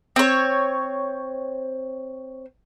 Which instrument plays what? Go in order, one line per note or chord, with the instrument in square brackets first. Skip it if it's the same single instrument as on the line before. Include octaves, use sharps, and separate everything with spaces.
[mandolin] C4 C#5